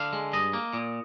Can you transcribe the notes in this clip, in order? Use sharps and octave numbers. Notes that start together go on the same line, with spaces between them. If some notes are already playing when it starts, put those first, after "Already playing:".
Already playing: D3 F5
G#3
G2 D#5
A#3
A#2